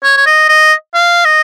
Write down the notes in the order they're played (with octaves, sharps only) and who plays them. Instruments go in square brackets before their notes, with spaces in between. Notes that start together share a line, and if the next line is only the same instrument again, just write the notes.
[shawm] C#5
C#5
D#5
D#5
F5
D#5